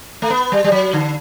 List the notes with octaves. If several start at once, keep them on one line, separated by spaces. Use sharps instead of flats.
A3
B3
G3
G3
F#3
D3